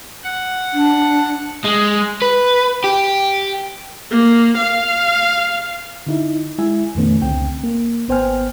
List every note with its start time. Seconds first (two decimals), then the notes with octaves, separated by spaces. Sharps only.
0.24 F#5
0.74 D4
1.65 G#3
2.22 B4
2.84 G4
4.11 A#3
4.58 F5
6.07 D3 D#4 E4
6.58 G#3 E4 E5 G#5
6.95 F2 A#2 D#3 A3 B3 C#4
7.22 C#2 D3 C4 G5
7.64 A#3
8.08 G#1 B3 C5 G5 G#5 F6